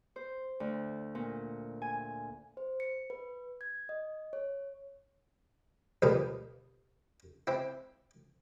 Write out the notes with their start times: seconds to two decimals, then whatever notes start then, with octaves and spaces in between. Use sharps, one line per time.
0.16 C5
0.60 D2
1.15 A#2
1.82 G#5
2.57 C5
2.80 C#7
3.10 B4
3.61 G#6
3.89 D#5
4.33 C#5
6.02 D2 G2 B2 F3 A#4 B4
7.47 C4 E4